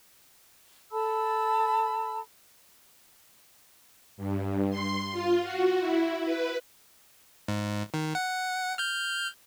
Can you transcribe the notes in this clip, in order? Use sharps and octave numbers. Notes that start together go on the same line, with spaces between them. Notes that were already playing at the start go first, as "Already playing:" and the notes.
A4 A5 B5 E6
G2
C6
F4
F#4
E4
B4
G#2
D#3
F#5
F6 G6